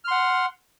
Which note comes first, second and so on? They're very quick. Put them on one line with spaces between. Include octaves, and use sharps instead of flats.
F6 C6 F#5